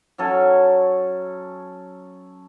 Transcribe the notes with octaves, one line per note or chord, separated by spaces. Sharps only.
F#3 C#4 A4 G#5